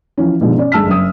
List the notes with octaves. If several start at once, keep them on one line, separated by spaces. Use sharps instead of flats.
E3 F3 C#4
G2 B2 D#3 F3 G3 G#3
C#4 D5
G1 G#3 A5 E6 F6 B6
F#1 D#6